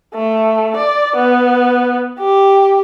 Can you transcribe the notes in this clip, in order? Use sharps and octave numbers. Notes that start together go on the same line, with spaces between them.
A3
D5
B3
G4